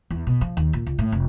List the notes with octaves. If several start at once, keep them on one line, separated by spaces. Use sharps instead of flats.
E2
B2
F3
D#2
A#2
C#2
A2
F1